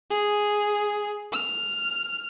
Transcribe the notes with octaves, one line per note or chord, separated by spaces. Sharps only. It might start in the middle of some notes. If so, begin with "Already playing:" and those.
G#4
F6